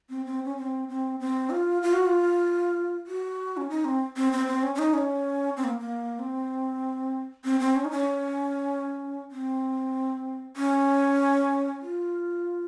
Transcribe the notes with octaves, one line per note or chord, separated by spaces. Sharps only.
C4
C4
C#4
C4
C4
C4
F4
F4
F#4
F4
F#4
C#4
D#4
C4
C4
C4
C4
C#4
C#4
D#4
C#4
C4
A#3
A#3
C4
C4
C4
C#4
D#4
C#4
C4
C#4
F4